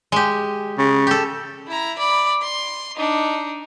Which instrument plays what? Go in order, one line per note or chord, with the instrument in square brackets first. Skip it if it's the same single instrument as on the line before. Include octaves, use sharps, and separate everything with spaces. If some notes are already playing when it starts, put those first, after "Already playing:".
[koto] G#3 G4
[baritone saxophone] C#3
[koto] G4 A4
[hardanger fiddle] E4 A#5
D5 B5
C6
D4 D#4